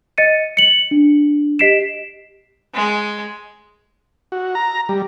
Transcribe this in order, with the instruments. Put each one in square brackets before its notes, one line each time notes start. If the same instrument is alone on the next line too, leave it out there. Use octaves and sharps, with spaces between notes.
[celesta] D#5 A6 C#7 D#7
C#7 F#7
D4
G4 D#5 B6 C7 D7 E7
[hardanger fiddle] G#3
[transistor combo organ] F#4
A#5
G3